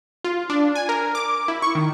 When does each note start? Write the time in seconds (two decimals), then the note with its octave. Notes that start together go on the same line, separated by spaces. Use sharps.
0.24 F4
0.50 D4
0.75 G#5
0.89 A#4
1.15 D6
1.48 E4
1.62 C#6
1.75 D#3